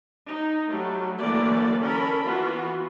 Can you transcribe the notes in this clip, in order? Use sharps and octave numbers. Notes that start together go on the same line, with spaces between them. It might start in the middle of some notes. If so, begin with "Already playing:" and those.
D#4
F#3 G3 A3
D3 E3 F#3 A3 A#3 D5
C#4 A4 A#4 B5
E3 B3 F4 F#4